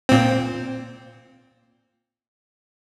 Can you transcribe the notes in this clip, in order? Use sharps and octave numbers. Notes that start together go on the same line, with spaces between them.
A#2 C4